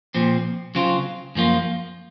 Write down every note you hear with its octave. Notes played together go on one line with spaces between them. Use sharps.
A#2 F3 C4
C#3 F#3 C4 F4
F#2 F3 A#3 F4